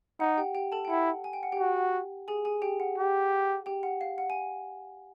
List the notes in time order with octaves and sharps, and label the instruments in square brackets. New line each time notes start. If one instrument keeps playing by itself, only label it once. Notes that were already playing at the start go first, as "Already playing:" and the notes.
[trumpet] D#4 [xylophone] F#5
[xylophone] G4 G5
G4 G5
A4 A5
G5
[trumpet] E4 [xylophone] F#5
[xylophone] G#5
G5
F#5
G4 G5
[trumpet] F#4
[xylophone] G#4 G#5
G#4 G#5
G4 G5
F#5
[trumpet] G4
[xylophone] G4 G5
F#5
F5
F#5
G#5